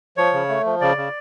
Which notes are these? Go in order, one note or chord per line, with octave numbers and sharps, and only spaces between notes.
F3 C#5
C#3
A3
F3
C#3 D5
C#3